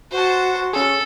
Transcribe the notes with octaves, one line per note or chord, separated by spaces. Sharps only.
F#4 C5 A5
C#4 G#4 A4